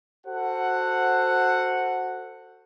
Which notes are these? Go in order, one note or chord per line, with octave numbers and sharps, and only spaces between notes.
F#4 A4 C5 F#5